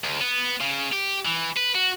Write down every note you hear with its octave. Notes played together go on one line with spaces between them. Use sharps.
D2
B3
C#3
G4
E3
B4
F#4